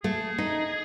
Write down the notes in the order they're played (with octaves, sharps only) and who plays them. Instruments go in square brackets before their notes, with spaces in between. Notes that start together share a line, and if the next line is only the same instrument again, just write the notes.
[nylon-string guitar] A3 [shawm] G#4
[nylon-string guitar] D#4